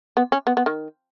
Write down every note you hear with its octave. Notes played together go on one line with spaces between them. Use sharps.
B3
C#4
B3
B3
D#3